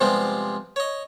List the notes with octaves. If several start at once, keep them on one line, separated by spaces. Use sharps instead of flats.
C3 F3 G3 G#3 B3 C4
C#5 D#5